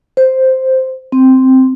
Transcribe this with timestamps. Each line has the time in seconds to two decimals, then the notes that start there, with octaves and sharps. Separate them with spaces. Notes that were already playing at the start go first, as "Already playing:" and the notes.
0.17 C5
1.12 C4